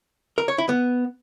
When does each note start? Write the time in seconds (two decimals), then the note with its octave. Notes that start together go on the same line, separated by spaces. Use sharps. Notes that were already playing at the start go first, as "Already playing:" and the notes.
0.38 A#4
0.48 C#5
0.58 E4
0.69 B3